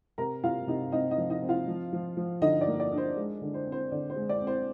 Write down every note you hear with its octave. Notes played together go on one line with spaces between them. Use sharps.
C3 A#4 A#5
C3 F4 F5
C3 D#4 D#5
C4 D#4 D#5
D#4 D#5
F3
D#4 D#5
C4
F4 F5
F3
F3
F3
D3 D#4 D#5
D5
A#3
D5
D4
C5
G#3
D3
C5
C4
C5
D3 D5
C5
G#3
D5
C4
C5